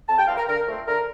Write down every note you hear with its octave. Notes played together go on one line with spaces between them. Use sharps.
F2 A5
G5
E3 G3 C4 F5
A#4
D3 A#4
F3 A3 C4
D3 A#4